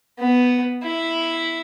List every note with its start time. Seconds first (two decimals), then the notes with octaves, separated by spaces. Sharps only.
0.19 B3
0.83 E4